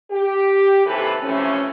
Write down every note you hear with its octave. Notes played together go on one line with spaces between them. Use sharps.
G4
D#2 C3 E3 A4 B4
F#2 C3 E3 F3 A3 C#4